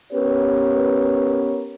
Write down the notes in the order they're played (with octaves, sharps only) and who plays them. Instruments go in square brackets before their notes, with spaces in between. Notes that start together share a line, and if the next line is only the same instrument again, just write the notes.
[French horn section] B3 C#4 G4 A#4 B4 C#5